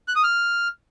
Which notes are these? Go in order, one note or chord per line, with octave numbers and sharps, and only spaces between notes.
F#6
D#6
F6